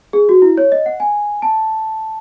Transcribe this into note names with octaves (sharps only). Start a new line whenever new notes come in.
G#4
F#4
E4
C#5
D#5
F#5
G#5
A5